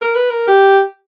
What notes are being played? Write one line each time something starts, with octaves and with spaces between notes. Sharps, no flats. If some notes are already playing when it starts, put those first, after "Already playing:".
A#4
B4
A#4
G4